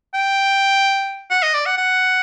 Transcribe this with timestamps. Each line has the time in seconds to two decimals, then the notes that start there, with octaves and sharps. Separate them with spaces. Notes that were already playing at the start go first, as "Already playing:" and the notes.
0.15 G5
1.31 F#5
1.43 D#5
1.54 D5
1.66 F#5
1.78 F#5